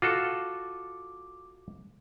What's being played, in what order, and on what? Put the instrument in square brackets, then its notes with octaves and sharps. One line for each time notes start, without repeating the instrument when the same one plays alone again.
[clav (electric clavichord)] F4 F#4 A4 [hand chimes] D6